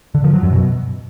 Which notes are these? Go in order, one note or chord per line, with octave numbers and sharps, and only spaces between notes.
D3
F3
F#3
F#2
B2